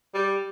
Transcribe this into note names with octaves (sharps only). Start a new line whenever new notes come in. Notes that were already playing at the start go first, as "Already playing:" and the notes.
G3